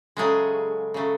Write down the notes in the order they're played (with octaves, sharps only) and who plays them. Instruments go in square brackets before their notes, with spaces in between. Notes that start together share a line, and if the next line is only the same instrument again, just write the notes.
[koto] C#3 F#3 G#3 A3 G#4
C#3 F#3 A3